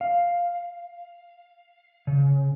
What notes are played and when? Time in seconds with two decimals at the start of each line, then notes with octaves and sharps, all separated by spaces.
0.01 F5
2.07 C#3